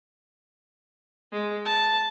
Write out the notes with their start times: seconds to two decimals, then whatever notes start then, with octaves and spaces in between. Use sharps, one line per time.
1.32 G#3
1.65 A5